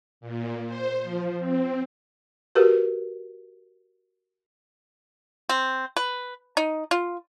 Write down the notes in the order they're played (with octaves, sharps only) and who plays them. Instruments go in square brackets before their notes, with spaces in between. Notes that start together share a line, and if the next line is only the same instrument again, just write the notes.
[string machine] A#2
C5
F3
C4
[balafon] F#4 G4 A#4 B4
[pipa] C4
B4
D#4
F4